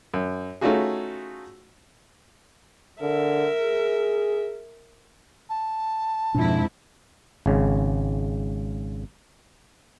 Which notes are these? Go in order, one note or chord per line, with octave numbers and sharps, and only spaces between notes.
F#2
A3 C#4 D#4 F4 F#4 G#4
D3 A#4 E5
G#4
A5
F2 G#2 B2 D4 E4
G#1 C#3